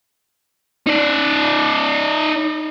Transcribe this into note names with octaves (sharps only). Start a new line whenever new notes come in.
D#4 D5